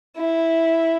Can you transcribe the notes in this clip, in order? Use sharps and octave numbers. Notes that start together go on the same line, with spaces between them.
E4